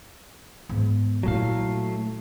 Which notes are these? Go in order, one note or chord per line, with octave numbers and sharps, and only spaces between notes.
G#2 B3
A#2 F#3 A3 E4 F5